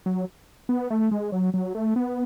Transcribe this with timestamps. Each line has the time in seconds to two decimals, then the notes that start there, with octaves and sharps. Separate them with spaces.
0.06 F#3
0.69 B3
0.90 A3
1.11 G#3
1.32 F#3
1.54 F#3
1.75 A3
1.96 B3